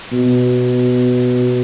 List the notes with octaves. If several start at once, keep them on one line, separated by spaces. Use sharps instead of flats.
B2